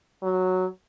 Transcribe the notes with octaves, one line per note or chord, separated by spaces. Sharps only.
F#3